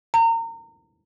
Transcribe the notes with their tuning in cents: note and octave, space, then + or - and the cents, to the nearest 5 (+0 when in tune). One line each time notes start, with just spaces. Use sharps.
A#5 -30